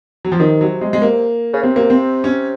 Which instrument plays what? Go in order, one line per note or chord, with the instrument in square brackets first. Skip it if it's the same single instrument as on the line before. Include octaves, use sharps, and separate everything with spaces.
[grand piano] F#3
F3
[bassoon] C3 [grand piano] D#3
[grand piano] F#3
G#3
G#3
A#3
[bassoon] C#3
[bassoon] C3 [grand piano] C4
[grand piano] A#3
C4
C#4